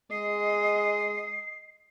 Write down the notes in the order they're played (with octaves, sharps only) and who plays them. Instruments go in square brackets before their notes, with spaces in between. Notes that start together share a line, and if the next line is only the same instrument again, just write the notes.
[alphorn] G#3 [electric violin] D#5 [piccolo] C7